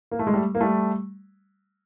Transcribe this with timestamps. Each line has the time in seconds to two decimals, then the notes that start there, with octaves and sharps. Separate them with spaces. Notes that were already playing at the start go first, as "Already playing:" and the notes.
0.11 A#3
0.19 A3
0.27 G#3
0.33 G3 A3
0.55 A#3
0.61 G3 A3